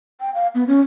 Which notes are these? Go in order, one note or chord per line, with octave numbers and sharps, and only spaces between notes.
G5
F5
B3
C#4